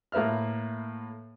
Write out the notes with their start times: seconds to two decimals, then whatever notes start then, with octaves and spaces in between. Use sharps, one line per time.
0.12 A2 A#3 B4 E5 F6